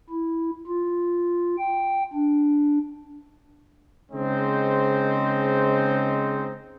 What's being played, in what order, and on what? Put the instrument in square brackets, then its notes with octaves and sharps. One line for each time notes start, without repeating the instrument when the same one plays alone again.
[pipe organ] E4
F4
G5
D4
[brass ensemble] C#3 G#3 C4 D#4 C5